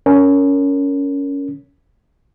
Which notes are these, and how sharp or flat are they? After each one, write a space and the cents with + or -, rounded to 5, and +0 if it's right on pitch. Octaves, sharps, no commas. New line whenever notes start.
C#4 +15 A#4 -10